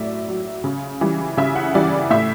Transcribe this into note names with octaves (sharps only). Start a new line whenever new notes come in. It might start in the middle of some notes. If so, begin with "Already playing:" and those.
Already playing: A2 F#3 D5 E5
F#3
C#3
E3 G3
C#3 E5
F#5
E3 G3 D5
A2 E5